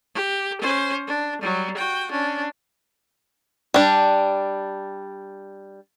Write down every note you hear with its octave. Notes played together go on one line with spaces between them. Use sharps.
G4
C#4 C5
D4
F#3 G3
F#4 G5
C#4 D4
G3 D4